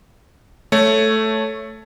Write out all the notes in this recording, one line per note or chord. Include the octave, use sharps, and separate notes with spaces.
A3 C#5